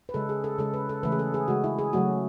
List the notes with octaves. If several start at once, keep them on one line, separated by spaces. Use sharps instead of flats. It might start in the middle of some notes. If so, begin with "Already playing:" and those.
B4
C#3 G#3 A4
G#4
A4
C#3 G#3 A4
B4
A4
C#3 E3 A3 B4
G#4
A4
G#4
C#3 G#3 F#4
E4
G#4
C#3 F#3 A3 F#4